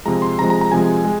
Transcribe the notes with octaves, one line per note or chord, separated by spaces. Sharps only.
C3 F3 G#3 A#5
C6
C3 F3 G#3 A#5
A#5
A#5
C3 F3 G#3 G#5
G#3